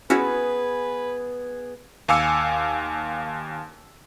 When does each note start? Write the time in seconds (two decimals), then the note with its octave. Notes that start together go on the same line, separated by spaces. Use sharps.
0.10 B3 C#4 E4 F#4 G#4 B4
2.08 D#2 F5 G#5 D6 E6 C#7